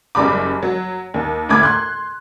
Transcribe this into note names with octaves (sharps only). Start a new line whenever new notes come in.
F#1 F#2 G3 B5 D6
F#3
D#2
D2 A2 B5 D6 G#6
C6 F#6